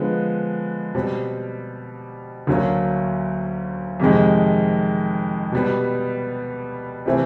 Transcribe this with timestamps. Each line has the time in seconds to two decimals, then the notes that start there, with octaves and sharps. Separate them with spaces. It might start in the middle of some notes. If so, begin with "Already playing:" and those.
Already playing: D3 F3 G#3 B3
0.94 B2 G3 C4
2.47 D2 D3 F#3 A#3 C#4
4.00 F2 C3 D#3 G#3
5.52 B2 G3 B3
7.06 C3 E3 A3 C4